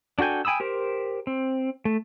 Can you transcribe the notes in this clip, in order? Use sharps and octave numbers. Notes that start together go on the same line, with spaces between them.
D4 F#4 A4 G5 G#5
G5 G#5 B5 D#6 E6
G4 A#4 C5
C4
A3